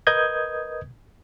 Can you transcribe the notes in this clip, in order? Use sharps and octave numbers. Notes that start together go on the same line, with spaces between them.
A#4 B4 D#5 D#6 G6 G#6